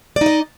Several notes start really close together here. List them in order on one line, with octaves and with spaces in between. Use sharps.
D5 D#4 D#5